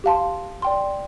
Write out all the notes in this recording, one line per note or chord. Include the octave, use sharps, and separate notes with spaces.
G4 F5 A5 C6
D5 G5 C6